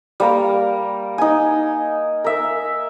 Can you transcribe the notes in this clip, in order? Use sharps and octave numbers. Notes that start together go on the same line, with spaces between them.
G3 A#3 A#4
D#4 G#5
A#4 E5